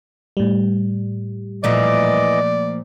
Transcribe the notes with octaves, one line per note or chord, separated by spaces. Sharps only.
A2 G3
A#2 E3 F3 A3 D5 D#5 D6